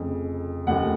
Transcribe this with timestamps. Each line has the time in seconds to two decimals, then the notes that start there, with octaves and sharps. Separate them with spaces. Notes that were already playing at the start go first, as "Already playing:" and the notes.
Already playing: F1 F2 C#3
0.67 F1 D#2 C#3 F3 A3 F#5